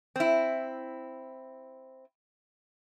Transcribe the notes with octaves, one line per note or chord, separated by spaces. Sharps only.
C4 E4